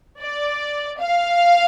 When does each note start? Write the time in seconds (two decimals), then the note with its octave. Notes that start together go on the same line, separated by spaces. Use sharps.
0.19 D5
0.98 F5